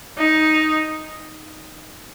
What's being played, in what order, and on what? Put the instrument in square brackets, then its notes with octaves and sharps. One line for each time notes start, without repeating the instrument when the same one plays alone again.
[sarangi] D#4